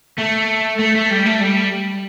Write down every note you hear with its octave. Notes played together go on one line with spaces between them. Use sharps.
A3
A3
A3
G3
A3
G3